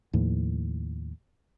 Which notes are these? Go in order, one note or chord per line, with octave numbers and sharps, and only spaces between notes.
D#2 A2 F3